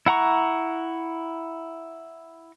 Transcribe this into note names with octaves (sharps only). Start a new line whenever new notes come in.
E4 F#5 A#5 C#6